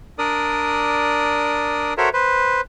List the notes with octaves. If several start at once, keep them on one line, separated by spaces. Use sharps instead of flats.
D4 A#4 D5 D#6
F#4 A4 A#4 C5 C#5 E5
B4 C5